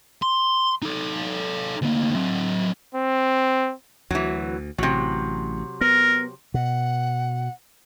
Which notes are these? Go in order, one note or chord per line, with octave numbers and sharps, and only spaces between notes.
C6
D#4 A4
D2 A#3
F#3 C4
C4
D2 E3 F#3
A1 C3 F#3
B3 A#4
B2 F#5